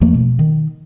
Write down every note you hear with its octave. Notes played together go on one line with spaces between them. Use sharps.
E2 F3 A3 A#3
B2
D#3